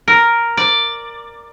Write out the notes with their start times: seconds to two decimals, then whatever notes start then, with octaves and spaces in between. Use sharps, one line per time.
0.08 A#4
0.57 D5